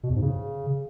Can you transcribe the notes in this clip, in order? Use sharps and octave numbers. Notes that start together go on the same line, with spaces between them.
B2
E2
G#2
C#3